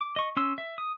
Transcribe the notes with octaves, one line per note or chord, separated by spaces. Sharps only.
D6
D#5 C#6
C#4 C6 E6
E5
D#6